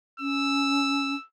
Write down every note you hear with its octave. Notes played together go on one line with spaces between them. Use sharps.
C#4 E6